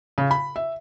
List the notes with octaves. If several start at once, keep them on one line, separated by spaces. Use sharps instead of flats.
C#3
B5
E5